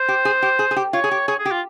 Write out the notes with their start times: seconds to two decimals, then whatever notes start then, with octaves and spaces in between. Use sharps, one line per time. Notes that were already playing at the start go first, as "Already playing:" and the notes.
Already playing: C5
0.08 G4
0.25 G#4
0.42 G4
0.59 G#4
0.71 G#4
0.76 G4
0.93 F4 C#5
1.04 G#4
1.11 G4
1.28 G#4 C#5
1.39 G#4
1.45 G4
1.51 F4